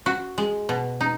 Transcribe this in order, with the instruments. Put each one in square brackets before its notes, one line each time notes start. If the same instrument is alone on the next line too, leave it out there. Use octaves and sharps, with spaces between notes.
[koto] F#4
G#3
B2
D#4